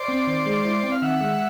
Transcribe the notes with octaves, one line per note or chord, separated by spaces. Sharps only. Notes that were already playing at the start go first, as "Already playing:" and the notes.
Already playing: C5 D5
C4
D#3
G#3
E4
C4
F5
D#3 E5 F#5
G#3